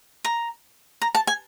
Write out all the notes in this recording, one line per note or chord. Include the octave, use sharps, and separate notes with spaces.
A#5
A#5
A5
G#5